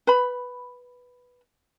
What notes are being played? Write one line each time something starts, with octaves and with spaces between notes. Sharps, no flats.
B4 B5